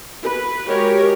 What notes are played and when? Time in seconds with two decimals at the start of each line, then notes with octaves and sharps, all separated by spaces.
0.23 B4
0.65 G#3 F#4 G4 A#4 C#5